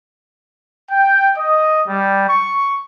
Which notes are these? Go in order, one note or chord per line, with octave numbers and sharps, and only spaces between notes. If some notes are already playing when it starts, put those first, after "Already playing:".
G5
D#5
G3
C#6